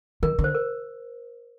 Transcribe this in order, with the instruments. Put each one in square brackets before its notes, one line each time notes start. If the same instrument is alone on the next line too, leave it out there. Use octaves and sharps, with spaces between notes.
[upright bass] D#3 [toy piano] A#4
[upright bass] D3
[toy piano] C5
A#4